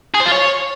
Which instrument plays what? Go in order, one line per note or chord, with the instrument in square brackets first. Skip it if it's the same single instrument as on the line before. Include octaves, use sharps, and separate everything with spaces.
[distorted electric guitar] G#4
C5
F4
C#5